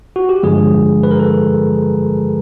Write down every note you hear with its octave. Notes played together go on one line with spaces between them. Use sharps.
F#4
G4
G2 D3 F3 G#3 G#4
B4
A#4
A4